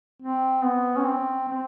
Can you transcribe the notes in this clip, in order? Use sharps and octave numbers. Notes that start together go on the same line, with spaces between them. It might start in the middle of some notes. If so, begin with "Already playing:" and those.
C4
B3
C#4
C4
C4